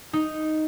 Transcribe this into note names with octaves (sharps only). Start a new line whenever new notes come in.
D#4